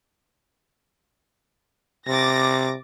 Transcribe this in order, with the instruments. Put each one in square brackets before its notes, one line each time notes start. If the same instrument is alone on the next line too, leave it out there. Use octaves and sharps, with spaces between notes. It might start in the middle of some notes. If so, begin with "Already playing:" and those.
[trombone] C3 [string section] D6 A6 A#6